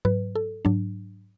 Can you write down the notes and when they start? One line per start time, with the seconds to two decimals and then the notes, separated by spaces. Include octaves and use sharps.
0.05 G#2 F#3 B4
0.35 A4
0.65 G#2 F#3 D4